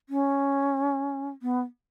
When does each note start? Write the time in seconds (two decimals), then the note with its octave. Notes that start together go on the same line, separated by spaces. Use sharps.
0.09 C#4
1.42 B3